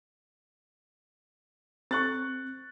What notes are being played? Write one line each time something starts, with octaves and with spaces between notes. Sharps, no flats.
C4 C#6 F#6 A6